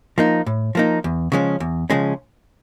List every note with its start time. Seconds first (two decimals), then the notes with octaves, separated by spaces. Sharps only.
0.18 F3 A#3 D#4
0.46 A2
0.75 F3 A#3 D#4
1.04 E2
1.32 C#3 F3 G#3 C#4
1.60 E2
1.90 C#3 F3 G#3 C#4